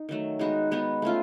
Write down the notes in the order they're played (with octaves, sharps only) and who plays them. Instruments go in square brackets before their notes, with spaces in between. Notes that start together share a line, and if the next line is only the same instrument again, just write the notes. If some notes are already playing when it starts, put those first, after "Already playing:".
Already playing: [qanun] D#4
D#3 F#3 A3
G#3 B3 D#4 F#4
G#3 B3 D#4 F#4
A3 C#4 F4